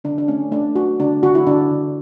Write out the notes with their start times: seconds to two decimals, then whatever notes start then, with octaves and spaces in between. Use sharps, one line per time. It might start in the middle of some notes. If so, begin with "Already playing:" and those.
0.04 D3 D4
0.18 D4
0.28 A3 C#4
0.51 A3 D4
0.75 A3 F#4
1.00 D3 D4
1.23 D3 F#4
1.35 E4
1.47 D3 D4
1.70 D3